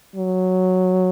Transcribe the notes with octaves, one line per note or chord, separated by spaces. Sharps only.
F#3